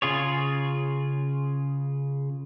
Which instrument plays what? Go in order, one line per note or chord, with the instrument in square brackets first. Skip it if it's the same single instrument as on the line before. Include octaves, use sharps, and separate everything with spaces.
[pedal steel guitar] C#3 F4 G#4 C#5